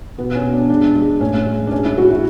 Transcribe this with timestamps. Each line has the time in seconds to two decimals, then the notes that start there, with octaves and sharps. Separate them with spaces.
0.18 B2 B3
0.35 C#4
0.44 B2
0.53 D4
0.70 G#3 D4
0.95 G#3
1.21 A2 C#4
1.46 G#3
1.67 D4
1.71 G#3 C#4
1.85 E4
1.98 G#3 F#4
2.10 E4